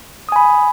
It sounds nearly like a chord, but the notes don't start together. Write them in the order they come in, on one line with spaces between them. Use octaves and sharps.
D#6 G#5 B5